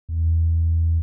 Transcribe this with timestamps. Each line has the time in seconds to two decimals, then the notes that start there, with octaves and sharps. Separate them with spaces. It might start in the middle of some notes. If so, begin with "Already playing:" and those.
0.09 E2